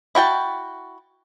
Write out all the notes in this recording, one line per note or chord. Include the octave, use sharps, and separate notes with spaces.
E4 F#4 G5 A5